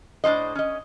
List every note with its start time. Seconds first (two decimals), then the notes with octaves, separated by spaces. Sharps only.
0.24 A2 D4 E4 C5 D#5
0.55 C#4 D#5